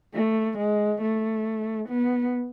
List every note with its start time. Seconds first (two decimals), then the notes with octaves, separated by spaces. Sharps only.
0.14 A3
0.57 G#3
1.01 A3
1.88 B3